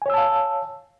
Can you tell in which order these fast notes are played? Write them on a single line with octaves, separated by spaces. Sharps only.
G#5 C#5 E6 A5 F5